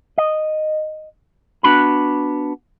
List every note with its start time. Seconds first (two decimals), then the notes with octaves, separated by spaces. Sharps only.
0.18 D#5
1.63 B3 D4 F#4 B5